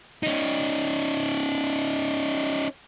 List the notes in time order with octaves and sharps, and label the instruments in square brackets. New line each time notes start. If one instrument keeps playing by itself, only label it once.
[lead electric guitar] C#4 D#4